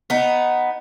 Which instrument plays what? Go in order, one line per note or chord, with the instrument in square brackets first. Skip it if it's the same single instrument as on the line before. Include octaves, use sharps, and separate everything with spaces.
[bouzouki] B3 D#4